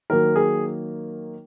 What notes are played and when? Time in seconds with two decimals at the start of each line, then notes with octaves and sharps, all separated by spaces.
0.10 D#3 F#3 A#3 A#4
0.36 G#4